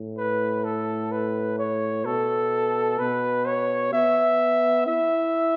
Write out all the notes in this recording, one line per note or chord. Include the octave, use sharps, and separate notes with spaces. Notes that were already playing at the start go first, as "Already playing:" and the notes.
Already playing: A2
B4
A4
B4
C#5
B2 A4
B2 B4
C#5
B3 E5
E4 E5